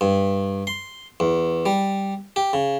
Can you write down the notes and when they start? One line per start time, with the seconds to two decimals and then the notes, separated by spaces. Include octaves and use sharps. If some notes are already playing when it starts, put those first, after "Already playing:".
0.01 G2
0.67 C6
1.20 E2
1.66 G3
2.36 G4
2.53 C#3